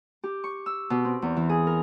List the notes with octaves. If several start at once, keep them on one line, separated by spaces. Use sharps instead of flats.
G4
C#6
E6
B2
C4
E2
E3
G#4
A#4